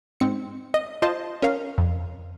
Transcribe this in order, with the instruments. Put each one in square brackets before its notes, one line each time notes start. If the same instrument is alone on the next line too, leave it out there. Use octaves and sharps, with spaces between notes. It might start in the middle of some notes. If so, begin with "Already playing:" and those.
[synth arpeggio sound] G#2 C4 C#7
D#5
F4 C5 D#5 A5
C#4 A#4 F5
F2